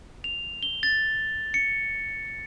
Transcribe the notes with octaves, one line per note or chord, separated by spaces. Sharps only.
F7
G7
A6
C#7